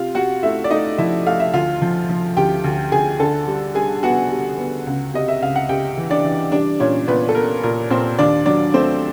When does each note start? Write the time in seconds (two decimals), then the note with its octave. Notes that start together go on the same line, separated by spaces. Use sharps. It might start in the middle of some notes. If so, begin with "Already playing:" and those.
Already playing: C3 F4 F5
0.15 C3 F#4 F#5
0.43 A3 E4 E5
0.64 D5
0.70 A3 D#4 D#5
0.98 F3 E4 E5
1.26 A3 F5
1.40 E5
1.53 D2 F4 F5
1.82 F3
2.09 F3
2.37 D2 G4 G5
2.64 D2
2.92 D2 G#4 G#5
3.20 D3 A4 A5
3.47 G3
3.75 G3 G#4 G#5
4.03 B3 F#4 F#5
4.31 G3
4.58 B3
4.87 C#2
5.14 C3 D#5
5.28 E5
5.42 C#2 F5
5.56 F#5
5.69 C#2 G4 G5
5.97 E3
6.10 D4 D5
6.25 E3
6.52 G3 D4 D5
6.80 A#2 C#4 C#5
7.07 A#2 B3 B4
7.29 A4
7.35 B3 A#4
7.63 A#2 A#4
7.90 A#2 C4 C5
8.19 D#2 D4 D5
8.46 F#3 D4 D5
8.74 A3 C4 C5